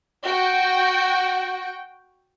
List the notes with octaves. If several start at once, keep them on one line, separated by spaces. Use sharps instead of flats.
F#4 G5